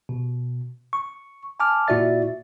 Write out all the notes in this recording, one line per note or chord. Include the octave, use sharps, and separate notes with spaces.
B2
C#6
G#5 A5 D6 F6
A#2 E4 F#4 D5 E5 A6